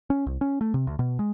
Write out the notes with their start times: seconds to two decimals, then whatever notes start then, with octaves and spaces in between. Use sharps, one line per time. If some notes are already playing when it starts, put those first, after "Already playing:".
0.10 C#4
0.26 C2
0.41 C#4
0.61 A3
0.74 C3
0.87 D2
0.99 B2
1.19 G#3